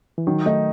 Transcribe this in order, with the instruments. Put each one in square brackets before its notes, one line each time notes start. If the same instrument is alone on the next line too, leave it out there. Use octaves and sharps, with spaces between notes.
[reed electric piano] E3
[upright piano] D#3 [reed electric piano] F#3
[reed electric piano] A3 [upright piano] D#4